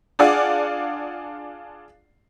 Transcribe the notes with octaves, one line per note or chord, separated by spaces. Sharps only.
D4 F4 G#4 D5 F5 F#5